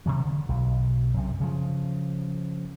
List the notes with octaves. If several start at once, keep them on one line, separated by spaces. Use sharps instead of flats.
C3 E3 F#3
D3
B1
F#2 C3
C#3 F3